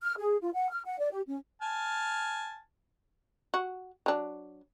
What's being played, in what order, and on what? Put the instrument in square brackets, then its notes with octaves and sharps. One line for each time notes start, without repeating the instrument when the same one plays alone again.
[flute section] F6
G#4
F4
F#5
F6
F#5
D5
G4
C#4
[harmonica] G#5 A5 F6
[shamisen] F#4
F#3 D4